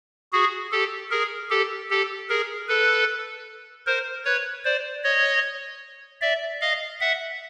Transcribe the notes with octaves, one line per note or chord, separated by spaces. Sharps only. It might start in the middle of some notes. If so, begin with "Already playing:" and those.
F#4 G#4
G4 A4
G#4 A#4
G4 A4
G4 A4
G#4 A#4
A4 B4
A#4 C5
B4 C#5
C5 D5
C#5 D#5
D5 E5
D#5 F5
E5 F#5